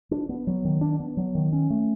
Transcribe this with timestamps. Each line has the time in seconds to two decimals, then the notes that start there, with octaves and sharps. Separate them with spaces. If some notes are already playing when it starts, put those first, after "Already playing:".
0.11 D4
0.29 B3
0.47 F#3
0.65 D#3
0.81 D4
1.00 B3
1.17 F#3
1.35 D#3
1.53 C#4
1.70 A3